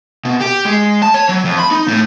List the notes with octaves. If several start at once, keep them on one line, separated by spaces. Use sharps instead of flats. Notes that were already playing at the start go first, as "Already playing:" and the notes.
B2
G4
G#3
A5
C#5
F#3
F2
B5
D#4
A2